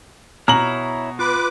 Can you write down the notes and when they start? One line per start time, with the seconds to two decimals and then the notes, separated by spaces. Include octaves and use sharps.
0.48 B2 E4 C#5 A#5 F6 F#7
1.19 F4 B4 D6